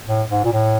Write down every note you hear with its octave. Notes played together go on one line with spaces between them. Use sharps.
A2
G#2
A#2
A2